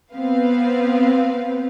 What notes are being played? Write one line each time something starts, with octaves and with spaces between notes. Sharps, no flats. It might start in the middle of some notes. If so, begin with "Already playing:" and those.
B3 C4 B4 F5